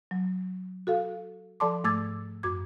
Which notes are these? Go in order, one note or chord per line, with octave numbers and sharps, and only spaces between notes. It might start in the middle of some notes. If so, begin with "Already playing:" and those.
F#3
F#4 A4 F5
F3 A4 D5 A5 C6 D6
G#2 A3 D6 E6 G#6 A6
F#2 F#4 D6 G#6